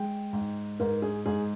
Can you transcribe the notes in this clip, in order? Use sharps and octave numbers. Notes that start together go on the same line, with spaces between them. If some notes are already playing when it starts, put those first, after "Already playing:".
Already playing: G#3 G5
G#2
G#2 A#4
G#4
G#2 G#4